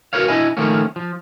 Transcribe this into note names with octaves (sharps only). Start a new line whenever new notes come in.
F#4 G4 A#4 B4 C#5 F5
D4 E4 D#5 G#5
D#3 F3 A3 A#3 C#4
F3